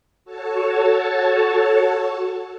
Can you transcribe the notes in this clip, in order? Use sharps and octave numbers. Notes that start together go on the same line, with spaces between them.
F#4 A4 C#5 A5